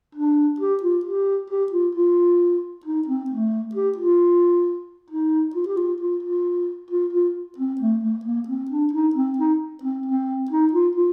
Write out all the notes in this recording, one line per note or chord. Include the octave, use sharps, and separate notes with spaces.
D4
G4
F4
G4
G4
F4
F4
D#4
C4
A3
G4
F4
D#4
F4
G4
F4
F4
F4
F4
F4
C4
A3
A3
A#3
C4
D4
D#4
C4
D#4
C4
C4
D#4
F4
F4